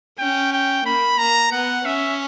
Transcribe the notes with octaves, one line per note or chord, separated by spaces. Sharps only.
C#4 G5
G5
A#3 B5
A#3 A#5
B3 F#5
C#4 E5